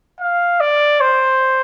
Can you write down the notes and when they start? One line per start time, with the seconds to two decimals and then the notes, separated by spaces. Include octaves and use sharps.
0.20 F5
0.60 D5
1.01 C5